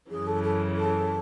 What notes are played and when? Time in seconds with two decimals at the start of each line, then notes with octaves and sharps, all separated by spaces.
0.11 F#2 C#3 E3 G#4
0.27 A4
0.43 A4
0.76 A4